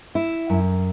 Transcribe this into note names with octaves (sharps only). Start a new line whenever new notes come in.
E4
F#2